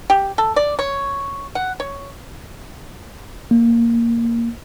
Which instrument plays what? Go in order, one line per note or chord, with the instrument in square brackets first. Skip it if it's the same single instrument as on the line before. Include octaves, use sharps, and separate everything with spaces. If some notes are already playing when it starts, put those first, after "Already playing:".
[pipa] G4
A4
D5
C#5
F#5
C#5
[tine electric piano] A#3